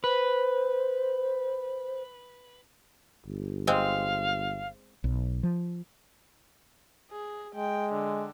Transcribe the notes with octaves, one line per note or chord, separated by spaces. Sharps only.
B4 C5
G1
G#3 C4 F5
B1
F3
G#4
G#3 G5
D3